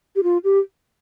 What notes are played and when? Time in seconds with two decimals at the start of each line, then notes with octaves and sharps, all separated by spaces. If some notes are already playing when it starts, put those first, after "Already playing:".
0.16 G4
0.23 F4
0.44 G4